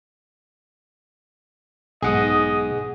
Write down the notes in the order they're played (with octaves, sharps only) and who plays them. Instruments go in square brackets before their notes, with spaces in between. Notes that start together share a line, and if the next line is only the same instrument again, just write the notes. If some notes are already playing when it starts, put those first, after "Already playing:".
[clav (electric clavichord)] B1 G#2 [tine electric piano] G#4 F#5 D#6 [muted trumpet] D#5